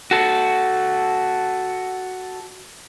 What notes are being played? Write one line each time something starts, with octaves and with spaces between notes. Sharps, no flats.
F#4 A4